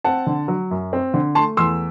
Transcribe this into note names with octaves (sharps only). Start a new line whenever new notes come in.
C4 F#5 A5
D3
F#3
F#2
C4
D3
A3 A5 C6
E2 C6 E6